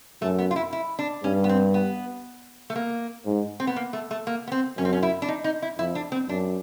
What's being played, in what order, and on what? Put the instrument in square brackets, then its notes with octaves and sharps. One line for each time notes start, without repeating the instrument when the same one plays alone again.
[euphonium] F#2 [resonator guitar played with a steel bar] A3
[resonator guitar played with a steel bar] B3
F4
E4
E4
D4
[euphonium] G2 [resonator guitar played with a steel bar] C#4
[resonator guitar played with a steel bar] B3
C4
B3
A3
A#3
[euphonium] G#2
[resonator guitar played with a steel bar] C4
B3
A#3
A3
A3
A#3
B3
C4
[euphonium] F#2 [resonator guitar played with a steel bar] C#4
[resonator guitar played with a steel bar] C4
C#4
E4
D4
D#4
D#4
E4
[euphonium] F2 [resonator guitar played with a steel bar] E4
[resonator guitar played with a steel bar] D4
C4
[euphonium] F#2 [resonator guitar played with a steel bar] D4